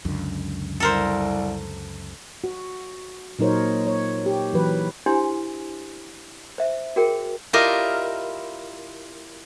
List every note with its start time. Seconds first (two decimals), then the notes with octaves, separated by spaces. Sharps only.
0.05 C#2 F#2 D3
0.80 C2 A4 A#4 C5
2.44 F#4
3.39 A#2 F#3 D#4 A#4 C5 C#5
3.87 C#5
4.26 G4
4.53 E3 F#3 B4
5.06 D4 E4 G4 C5 G#5 C6
6.58 C5 E5
6.96 F#4 G#4 A#4 G5
7.53 E4 F4 G4 A#4 D5 D#5